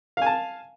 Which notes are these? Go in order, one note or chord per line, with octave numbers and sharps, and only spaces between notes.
F5 G#5 A5